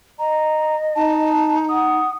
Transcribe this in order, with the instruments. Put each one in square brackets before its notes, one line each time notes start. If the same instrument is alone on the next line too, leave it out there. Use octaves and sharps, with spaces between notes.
[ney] D#5 [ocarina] A#5
[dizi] D#4 [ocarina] A5
[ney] F#5 [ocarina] D#6